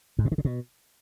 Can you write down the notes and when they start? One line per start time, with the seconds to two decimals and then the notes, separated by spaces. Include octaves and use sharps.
0.19 G#2
0.25 A#2
0.32 D#3
0.38 C#3
0.45 B2